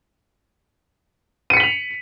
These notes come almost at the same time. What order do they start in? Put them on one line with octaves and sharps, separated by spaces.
D#7 C#7 B6 F#7 F7